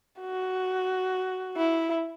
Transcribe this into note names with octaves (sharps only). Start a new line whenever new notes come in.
F#4
E4